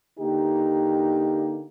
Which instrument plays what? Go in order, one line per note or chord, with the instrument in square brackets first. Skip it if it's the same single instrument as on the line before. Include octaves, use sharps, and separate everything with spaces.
[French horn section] D3 A#3 D#4 G4